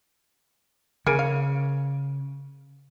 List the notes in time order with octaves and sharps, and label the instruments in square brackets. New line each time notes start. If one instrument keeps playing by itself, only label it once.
[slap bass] C#3 [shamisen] A#3 G#4
[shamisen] F5